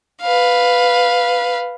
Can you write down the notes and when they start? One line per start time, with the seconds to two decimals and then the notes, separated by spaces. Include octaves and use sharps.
0.22 B4 F5